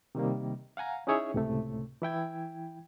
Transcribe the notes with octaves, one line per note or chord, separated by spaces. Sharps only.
C3 D#3 G3 A#3
F5 F#5 G#5 A#5
C#4 D#4 E4 G#4 C#5 E5
C#2 A2 C3 A3
E3 E4 G5 G#6